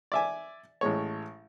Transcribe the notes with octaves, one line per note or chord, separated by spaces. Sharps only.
D5 E5 G#5
A1 A2 G#3 C#5